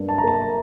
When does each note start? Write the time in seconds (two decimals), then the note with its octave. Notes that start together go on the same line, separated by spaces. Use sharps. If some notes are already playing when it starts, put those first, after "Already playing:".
Already playing: G2 A#3
0.09 A5
0.18 A#5
0.24 A#3 A5